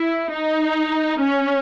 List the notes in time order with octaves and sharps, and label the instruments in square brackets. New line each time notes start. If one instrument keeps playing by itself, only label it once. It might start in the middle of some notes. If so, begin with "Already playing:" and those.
Already playing: [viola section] E4
D#4
C#4